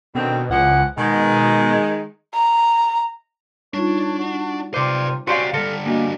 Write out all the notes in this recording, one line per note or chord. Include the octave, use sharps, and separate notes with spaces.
B2 D3 D#3 C4
C#2 E3 F3 F#5
B2 D#3 G#3
A#5
G3 D4 D#4 F4 C#5
F#4
C3 F4 B4 C5 D5 D6
C#4 F#4 G4 C5 D5 F5 C6 G6
D3 G3 A4 F5 A#6
A#3 D4 F#4 D#5 G#5